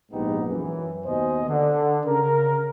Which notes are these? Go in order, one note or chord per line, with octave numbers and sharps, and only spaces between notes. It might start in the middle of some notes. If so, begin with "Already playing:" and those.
A#1 G#2 B3 D#4 G4
F#2 E3
D#2 B2 C5 D#5 G#5
D3
C#3 A#4